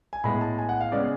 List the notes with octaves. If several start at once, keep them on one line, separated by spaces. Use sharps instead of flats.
G#5
A2 G#3 B3 B5
A5
G#5
F#5
F5
C#3 G#3 B3 D5